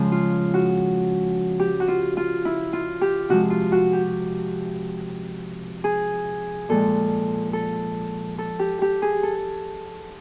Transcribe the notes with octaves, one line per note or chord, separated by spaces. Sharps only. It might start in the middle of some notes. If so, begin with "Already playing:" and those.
Already playing: C#3 F3 G#3
F4
F#4
G4
F#4
F4
F4
E4
F4
G4
C3 F3 G#3 F#4
F4
F#4
G4
G#4
A#2 F3 G#3 A4
A4
A4
G4
G4
G#4
A4